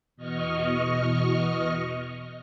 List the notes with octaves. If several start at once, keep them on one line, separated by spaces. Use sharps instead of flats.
E2 B2 D#5 C#6 F6